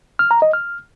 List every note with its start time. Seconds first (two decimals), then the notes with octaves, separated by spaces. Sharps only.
0.19 F6
0.31 A#5
0.42 D#5
0.53 F6